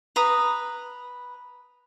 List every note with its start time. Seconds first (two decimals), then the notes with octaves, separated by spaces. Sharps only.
0.16 B4 A#5 D#6